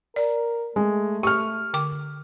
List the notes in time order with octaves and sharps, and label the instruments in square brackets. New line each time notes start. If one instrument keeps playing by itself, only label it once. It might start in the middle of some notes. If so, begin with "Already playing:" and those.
[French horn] A#4 [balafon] D5
[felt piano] G#3 [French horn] A3
[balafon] G4 [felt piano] C#6 F6
[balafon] D3 G5 D6